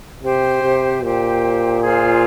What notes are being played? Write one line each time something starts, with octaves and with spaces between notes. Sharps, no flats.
C3 G4 C5 G5
C3
A#2 G4 C5 G5
F4 G#4 C5